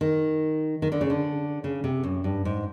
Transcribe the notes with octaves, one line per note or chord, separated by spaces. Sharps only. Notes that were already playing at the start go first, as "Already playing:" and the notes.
D#3
D#3
D3
C#3
D3
C#3
C3
F#2
G2
G#2